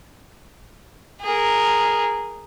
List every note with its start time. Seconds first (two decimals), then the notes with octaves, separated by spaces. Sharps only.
1.21 G#4 A#4